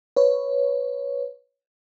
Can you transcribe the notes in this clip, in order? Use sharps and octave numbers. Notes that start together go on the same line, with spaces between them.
B4 C#5